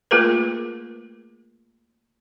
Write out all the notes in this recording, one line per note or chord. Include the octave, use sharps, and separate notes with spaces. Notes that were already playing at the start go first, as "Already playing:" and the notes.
A3 A#3 F4 G#4 A#4 B4